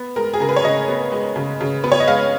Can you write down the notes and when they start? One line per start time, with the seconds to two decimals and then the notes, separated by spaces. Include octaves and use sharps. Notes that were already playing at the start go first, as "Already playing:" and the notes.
Already playing: B3
0.16 G#3 A#4
0.33 G#4
0.40 C#3 A#4
0.49 B4
0.56 C#5
0.64 C#3 D#5
0.88 B3
1.12 G#3
1.36 C#3
1.60 C#3
1.84 B3 B4
1.92 C#5
2.00 D#5
2.07 G#3 F5